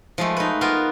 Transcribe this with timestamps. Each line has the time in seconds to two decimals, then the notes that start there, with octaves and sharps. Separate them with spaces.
0.18 F3 G#3 A3
0.37 D#4 B4
0.61 B3 F4 A#4